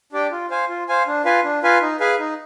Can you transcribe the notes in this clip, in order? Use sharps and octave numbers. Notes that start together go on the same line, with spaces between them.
D4 G4 D5 G5
F4
C5 F5 G#5
F4
C5 F5 G#5
D4
F4 B4 F5 G#5
D4
F4 B4 F5 G#5
D#4
G#4 B4 F5 G#5
D#4